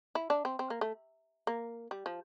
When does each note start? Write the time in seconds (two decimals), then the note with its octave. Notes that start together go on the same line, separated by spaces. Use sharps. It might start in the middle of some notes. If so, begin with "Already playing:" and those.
0.15 E4
0.30 D4
0.45 C4
0.59 C4
0.70 A#3
0.81 A3
1.47 A#3
1.91 G3
2.06 F3